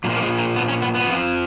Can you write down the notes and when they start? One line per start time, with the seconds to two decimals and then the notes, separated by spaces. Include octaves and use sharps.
0.04 A#2 F#3
0.09 F3
0.16 A#3
0.22 G#3
0.39 A#3
0.56 B3
0.68 C#4
0.82 B3
0.95 B3
1.07 F2 F3